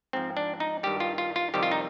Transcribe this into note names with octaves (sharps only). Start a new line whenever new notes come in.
G#2 F3 C4
D4
D#4
G2 D#3 G3 G4
F4
F4
F4
F2 C3 D#3 G3 G4
F4
D#4